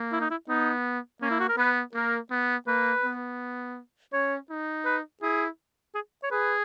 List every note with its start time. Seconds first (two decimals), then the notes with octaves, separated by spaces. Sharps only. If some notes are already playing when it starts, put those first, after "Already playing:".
Already playing: A#3
0.12 E4
0.21 D#4
0.30 E4
0.48 B3 D#4
1.21 A#3 C#4
1.31 E4
1.40 F#4
1.49 A#4
1.57 B3 B4
1.94 A#3 A#4
2.31 B3
2.67 A#3 B4
3.04 B3
4.13 C#4 C#5
4.50 D#4
4.85 B4
5.22 E4 G#4
5.95 G#4
6.23 C#5
6.31 G#4 B4